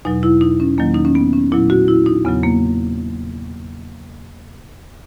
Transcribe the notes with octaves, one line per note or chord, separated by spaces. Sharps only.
E2 B2 F#3 D#4
E4
D#4
C#4
E2 D#3 F#3 A#3
D#4
C#4
B3
C#4
A#2 F#3 E4
F#4
E4
D#4
E2 C#3 F#3 B3
A#3